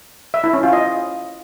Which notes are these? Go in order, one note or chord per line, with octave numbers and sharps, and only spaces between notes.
E5
E4
C#4
F4
D#5